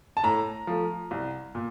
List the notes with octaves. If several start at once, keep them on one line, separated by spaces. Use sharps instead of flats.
A5
A2 A#5
F3 A3
C2
A#2